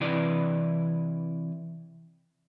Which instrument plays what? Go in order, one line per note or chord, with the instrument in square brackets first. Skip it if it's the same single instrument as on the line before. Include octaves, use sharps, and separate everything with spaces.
[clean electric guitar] C3 E3 E4 B4 D5